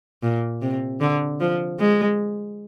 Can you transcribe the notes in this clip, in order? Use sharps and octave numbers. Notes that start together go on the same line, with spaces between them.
A#2
C3
D3
F3
G#3